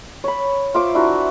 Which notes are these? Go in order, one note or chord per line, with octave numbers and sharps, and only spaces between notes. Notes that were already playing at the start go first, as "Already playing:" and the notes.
C#5 B5
F4 C5 E5 D6
D4 E4 F#4 A#4